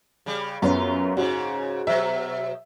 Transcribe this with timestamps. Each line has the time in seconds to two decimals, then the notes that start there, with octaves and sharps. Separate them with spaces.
0.26 C#3 G3
0.62 F#2 B3 C#4 F4
1.17 G#2 C#3 C#4 F#4
1.87 B2 F#3 E5